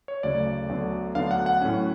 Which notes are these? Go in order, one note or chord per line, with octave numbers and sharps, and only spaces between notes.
C#5
D2 C#3 F#3 A3 D5
D2 D3 F#3 B3 D4
D2 D3 F#3 B3 D4 F5
F#5
F#5
A2 F#3 C#4